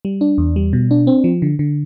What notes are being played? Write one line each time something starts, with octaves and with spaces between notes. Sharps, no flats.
G3
D4
E2
G3
B2
D4
C4
F3
D3
D3